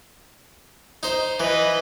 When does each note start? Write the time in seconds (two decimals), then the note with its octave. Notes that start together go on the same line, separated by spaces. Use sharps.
1.03 D#4 C5
1.40 E3 B4 D#5